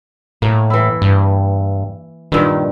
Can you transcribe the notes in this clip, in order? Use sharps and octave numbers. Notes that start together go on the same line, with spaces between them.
A2 A#3
E3 E4
G2
G2 A#2 D#3